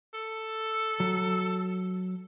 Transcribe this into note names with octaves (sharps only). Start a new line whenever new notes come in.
A4
F#3